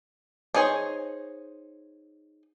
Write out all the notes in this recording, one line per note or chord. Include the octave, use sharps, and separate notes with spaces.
D4 D#4 G#4 C5 C#5